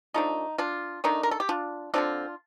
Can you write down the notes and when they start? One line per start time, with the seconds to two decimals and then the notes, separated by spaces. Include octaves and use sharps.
0.14 F3 A3 D4 D#4
0.58 D4 F4
1.04 D#3 A3 D4 D#4
1.23 A#4
1.31 A4
1.40 G4
1.49 D4 F4
1.94 D3 F3 A3 C4 D4 F4